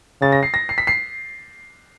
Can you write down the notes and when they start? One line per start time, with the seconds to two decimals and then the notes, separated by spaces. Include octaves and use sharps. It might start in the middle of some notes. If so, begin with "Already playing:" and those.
0.22 C#3 A6
0.32 A#6
0.43 C7
0.54 A#6
0.69 C7
0.78 B6
0.87 C7